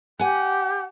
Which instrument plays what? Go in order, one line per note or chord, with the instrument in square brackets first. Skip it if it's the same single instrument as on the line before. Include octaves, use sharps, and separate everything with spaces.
[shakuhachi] G4 [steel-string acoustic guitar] F#5 G#5